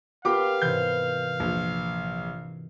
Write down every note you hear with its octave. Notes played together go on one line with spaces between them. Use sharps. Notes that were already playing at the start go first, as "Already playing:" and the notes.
B3 G4 A#4 F5 G5 D6
G#2 C3 E3 G6
A#1